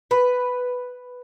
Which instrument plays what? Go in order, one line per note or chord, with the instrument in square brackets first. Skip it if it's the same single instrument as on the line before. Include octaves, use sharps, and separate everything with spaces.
[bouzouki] B4